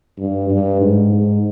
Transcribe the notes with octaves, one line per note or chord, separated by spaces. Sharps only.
G2
G2
G#2
G#2